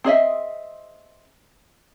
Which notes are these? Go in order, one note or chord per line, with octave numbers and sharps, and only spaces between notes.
C4 G#4 D#5 E5